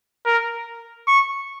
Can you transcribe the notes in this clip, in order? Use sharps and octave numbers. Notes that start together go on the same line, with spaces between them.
A#4
C#6